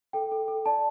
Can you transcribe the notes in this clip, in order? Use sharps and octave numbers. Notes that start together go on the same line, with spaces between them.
A4 G5
A4
A4
D5 A5